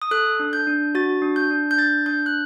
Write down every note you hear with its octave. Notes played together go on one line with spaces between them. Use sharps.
D#6
A4 F#6
D4
G6
D4
F#4 A6
D4
G6
D4
G6
D4 A6
D4 G6
F#6